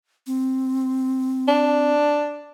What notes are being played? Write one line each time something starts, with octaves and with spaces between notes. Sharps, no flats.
C4
D4